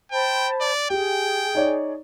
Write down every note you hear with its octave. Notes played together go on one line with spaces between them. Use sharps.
C5 G5 A5 B5
D5
G4 G#4 G5
D#4 C#5 D5